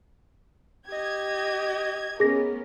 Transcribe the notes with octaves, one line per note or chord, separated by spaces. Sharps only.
G4 D#5 G#6
B3 C#4 G#4 A#4 A#6